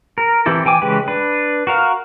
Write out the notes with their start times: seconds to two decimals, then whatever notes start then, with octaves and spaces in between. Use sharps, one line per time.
0.18 A#4
0.46 E3 C4 E4 G4 A4
0.65 E3 G5 G#5 D6
0.82 C#3 E3 G#3 G4 B4
1.08 D4 B4
1.67 F#4 A#4 F5